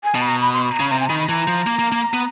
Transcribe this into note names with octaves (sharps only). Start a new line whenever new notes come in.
G#5
B2 A5
B5
A#5
B5
C6
B5
A#5
C#3 B5
C3 A#5
G#5
A#5
D#3 B5
B5
E3 A#5
F3
A#3
A#3
A#3
B3